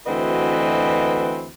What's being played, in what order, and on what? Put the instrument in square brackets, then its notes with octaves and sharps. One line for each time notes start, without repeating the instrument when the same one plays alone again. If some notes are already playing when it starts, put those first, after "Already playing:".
[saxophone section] D2 E3 C4 F#4 B4 D#5